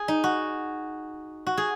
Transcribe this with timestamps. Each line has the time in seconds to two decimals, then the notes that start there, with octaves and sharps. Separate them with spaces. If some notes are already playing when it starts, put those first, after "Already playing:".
Already playing: G#4
0.08 D#4
0.24 F#4
1.47 F#4
1.57 G#4